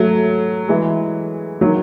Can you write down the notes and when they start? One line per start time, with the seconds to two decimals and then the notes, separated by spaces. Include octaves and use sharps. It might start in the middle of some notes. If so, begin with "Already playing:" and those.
Already playing: F#3 A3
0.69 E3 G#3
1.61 D#3 F#3